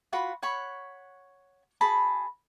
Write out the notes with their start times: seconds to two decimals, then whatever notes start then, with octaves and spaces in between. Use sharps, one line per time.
0.13 F4 F#4 F#5 B5
0.42 C#5 F#5 B5 C#6
1.81 F#4 G#4 A5 B5